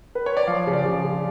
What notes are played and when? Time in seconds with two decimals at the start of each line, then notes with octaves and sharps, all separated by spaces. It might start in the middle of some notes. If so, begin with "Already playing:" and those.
0.15 B4
0.26 C#5
0.37 D5
0.47 F3 F5
0.67 C#3
0.73 D5
0.86 C#3
1.04 C#3